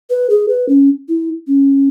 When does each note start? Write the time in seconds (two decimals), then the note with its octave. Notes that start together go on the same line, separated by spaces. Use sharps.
0.10 B4
0.30 G#4
0.49 B4
0.69 C#4
1.09 E4
1.48 C#4